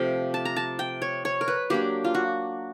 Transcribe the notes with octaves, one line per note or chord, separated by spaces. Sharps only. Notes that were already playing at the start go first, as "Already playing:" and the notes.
Already playing: C3 F3 A3 G5
A5
A#5
A5
G5
C#5
C#5
A#4
B4
F#3 A#3 D4 G4
F4
F#4